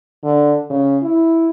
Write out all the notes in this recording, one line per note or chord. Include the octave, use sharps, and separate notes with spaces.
D3
C#3
E4